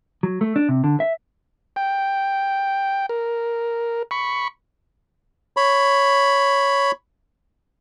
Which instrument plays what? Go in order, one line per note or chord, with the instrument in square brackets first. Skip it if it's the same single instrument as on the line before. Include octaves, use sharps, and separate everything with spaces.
[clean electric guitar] F#3
A3
D4
C3
D3
E5
[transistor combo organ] G5
A#4
B5 C#6
[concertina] C#5 B5